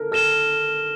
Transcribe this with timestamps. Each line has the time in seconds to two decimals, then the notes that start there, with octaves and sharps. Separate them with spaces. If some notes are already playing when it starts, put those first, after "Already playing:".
Already playing: A4 A#4
0.12 A4 F6 A#6 E7 G7